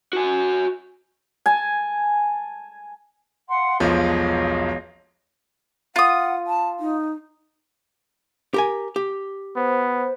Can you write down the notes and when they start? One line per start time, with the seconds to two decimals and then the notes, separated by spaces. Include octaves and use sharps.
0.13 F#4 G#5
1.46 G#5 A5
3.48 F5 F#5 C6
3.80 E1 B1 F3 C#5 D#5 F5
5.96 F4 F#5 D#6
6.47 A5
6.80 D#4
8.54 G4 A#4 G#5
8.96 G4
9.56 B3 C5